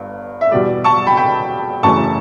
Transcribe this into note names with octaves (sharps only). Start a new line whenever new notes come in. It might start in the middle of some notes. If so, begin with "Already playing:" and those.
Already playing: G1 G2
E5
E2 B2 G3 D5
A5 C#6
G5 B5
G5 B5
F#1 F#2 C#3 E3 A3 A5 C#6